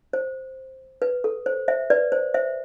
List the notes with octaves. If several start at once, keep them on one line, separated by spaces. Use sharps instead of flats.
C5
B4
A4
C5
C5 E5
B4 D5
C5
C5 E5